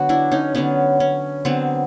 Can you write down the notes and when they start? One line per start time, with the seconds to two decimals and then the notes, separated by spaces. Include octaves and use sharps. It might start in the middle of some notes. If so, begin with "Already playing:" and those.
Already playing: D3 F#3 B3 F#4
0.09 D4 E4
0.32 C#4 D#4
0.55 D3 F#3 B3 C#4
1.00 C#4
1.45 D3 F#3 B3 C4